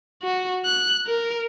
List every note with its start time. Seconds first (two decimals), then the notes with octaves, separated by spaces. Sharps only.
0.22 F#4
0.65 F#6
1.07 A#4